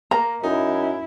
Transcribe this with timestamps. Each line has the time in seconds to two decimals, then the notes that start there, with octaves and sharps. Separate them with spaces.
0.11 A#3 A#5
0.43 F#2 D#4 E4